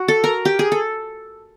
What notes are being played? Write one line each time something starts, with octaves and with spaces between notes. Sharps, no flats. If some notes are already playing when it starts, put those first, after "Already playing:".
Already playing: F#4
A4
A#4
G4
G#4
A4